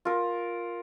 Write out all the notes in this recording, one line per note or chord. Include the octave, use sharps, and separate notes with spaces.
F4 A#4